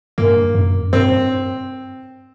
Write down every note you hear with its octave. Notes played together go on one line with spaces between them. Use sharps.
G2 A#3
F#2
G2 C4